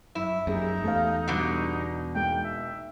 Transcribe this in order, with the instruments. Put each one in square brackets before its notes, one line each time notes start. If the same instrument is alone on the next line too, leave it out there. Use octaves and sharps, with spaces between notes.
[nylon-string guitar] F#2 [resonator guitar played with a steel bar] E4
[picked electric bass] F#2 [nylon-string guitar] A#3 G4 G#4 [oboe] D#4
[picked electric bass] E2 [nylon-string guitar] A3 G4 F5
[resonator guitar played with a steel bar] B2 D3 [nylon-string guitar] G3 F#5
[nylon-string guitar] G#3 A#3 D#4 [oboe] G5
[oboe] E5